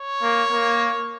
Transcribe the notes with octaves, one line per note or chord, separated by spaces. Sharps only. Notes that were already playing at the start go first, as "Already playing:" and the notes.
Already playing: C#5
A#3
A#3